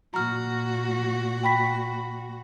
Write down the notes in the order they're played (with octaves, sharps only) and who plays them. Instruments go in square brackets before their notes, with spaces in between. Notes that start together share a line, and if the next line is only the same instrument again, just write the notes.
[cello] A#2 F#4 [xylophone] A#5 F6
[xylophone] G5 B5 B6